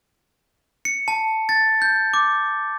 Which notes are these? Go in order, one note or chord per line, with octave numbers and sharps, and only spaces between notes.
C#7
A5
A6
G6
D6